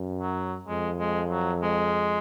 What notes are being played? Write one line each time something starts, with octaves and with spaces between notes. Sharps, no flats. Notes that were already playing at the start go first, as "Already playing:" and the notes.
Already playing: F#2
F#3
F2 G#3
G#3
F#3
G#3